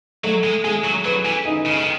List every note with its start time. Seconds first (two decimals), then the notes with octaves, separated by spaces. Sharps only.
0.24 F#3 A3
0.44 G#3
0.64 G#3 G#4
0.85 F#3
1.05 F#3 B4
1.26 E3
1.45 D#4
1.65 C#3
1.76 D#3